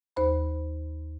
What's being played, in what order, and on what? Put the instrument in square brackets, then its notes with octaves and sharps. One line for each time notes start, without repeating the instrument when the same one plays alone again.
[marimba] D#2 C5 B5